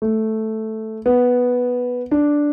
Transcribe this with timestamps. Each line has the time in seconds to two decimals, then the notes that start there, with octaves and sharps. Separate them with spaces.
0.02 A3
1.06 B3
2.11 D4